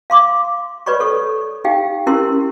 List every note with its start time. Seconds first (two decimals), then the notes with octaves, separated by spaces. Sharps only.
0.10 F5 C6 D6
0.86 B4 C#5 D5 B5 C#6
1.00 A4 C#6 D#6
1.64 D#4 G4 F5 G5
2.07 C#4 E4 G4 A#4 C6 E6